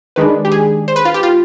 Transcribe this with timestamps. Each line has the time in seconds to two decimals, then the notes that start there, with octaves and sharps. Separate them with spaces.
0.16 D#3 G#3 D4 B4
0.45 G4
0.52 G#4
0.88 C5
0.96 B4
1.05 F4
1.14 G4
1.23 F4